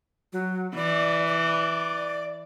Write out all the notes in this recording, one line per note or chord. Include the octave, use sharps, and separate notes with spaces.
F#3
E3 D5
D5